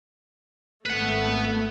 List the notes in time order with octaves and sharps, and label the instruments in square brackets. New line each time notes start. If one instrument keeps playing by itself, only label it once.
[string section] G#1 A3 [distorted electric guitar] B4 F#5